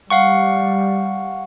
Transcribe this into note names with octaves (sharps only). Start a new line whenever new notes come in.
G3 F5 F#5 C#6